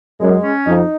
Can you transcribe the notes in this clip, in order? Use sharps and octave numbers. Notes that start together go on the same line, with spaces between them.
F#2 G#3
C#4
F2 D#4